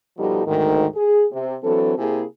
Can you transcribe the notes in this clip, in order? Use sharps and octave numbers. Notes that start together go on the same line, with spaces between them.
B2 F3 G3 D#4 G4 A4
D2 G#2 D#3
G#4
C3
E3 F#3 C4 D4 A4
C3 A#3 E4 G#4